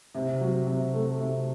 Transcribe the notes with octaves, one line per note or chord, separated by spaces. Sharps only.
C3
F#3
C3
A3
C3